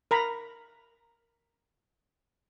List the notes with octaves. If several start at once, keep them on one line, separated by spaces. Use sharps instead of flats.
A#4 A#5 B5